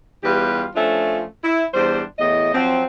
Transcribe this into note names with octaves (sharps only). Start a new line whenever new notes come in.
E2 G3 F4 G4 B4
F3 A3 C#4 D4 F4
E4
E2 G3 D4 C5
E2 A2 D#5
F3 F#3 C4